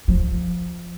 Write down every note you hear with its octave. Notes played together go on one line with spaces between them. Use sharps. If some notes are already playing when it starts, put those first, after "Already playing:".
F3